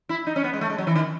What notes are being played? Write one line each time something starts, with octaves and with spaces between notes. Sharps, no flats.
E4
D#4
C#4
B3
G#3
A3
G#3
F#3
E3
D#3